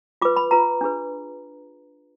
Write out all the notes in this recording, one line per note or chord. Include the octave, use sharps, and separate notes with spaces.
F4 B4 D6
B5
F4 B4 A#5
D4 G#4 B4